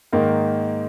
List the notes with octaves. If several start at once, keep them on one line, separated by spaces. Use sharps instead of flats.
G#2 D#3 A#3